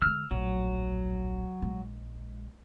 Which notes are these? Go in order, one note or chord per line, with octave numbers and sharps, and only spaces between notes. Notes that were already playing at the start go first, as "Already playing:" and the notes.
D3 G#3 E6 F6
D1 A#1 F#3
A#1 G#3